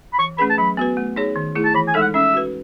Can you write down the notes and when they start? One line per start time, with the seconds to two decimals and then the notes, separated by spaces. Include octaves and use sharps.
0.13 B5
0.19 E3 C#6
0.38 A3 C#4 G#4 B4 B5
0.50 A5
0.58 F#3 B5
0.77 B3 F#4 B4
0.97 A3
1.16 D#4 G#4 C#5
1.36 D#3
1.55 A3 E4 G#4
1.64 A5
1.75 E3 B5
1.88 G#5
1.94 G#3 D#4 A4 E5
2.01 F#5
2.14 C#4 E5
2.34 F#4 B4